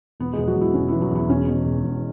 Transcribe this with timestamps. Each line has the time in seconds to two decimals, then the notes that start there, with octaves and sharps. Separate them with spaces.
0.20 E1 B3 B4
0.33 E1 G#3 G#4
0.47 F#3 F#4
0.56 E1
0.61 E4
0.74 E1 C#4
0.88 E3 E4
1.02 F#3 F#4
1.11 E2 E4
1.29 E1 C#4
1.48 B2
1.65 E1
1.84 E1